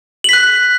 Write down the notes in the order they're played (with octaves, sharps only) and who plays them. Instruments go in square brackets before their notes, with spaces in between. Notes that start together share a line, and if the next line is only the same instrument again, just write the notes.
[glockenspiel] F#7
B6
F#6